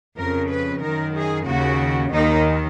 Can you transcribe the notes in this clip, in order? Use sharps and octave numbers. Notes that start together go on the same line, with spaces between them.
F2 C#3 A#4
B4
F#2 D#3 A#4
G#4
D#2 C#3 F#4
D#2 D#3 D#4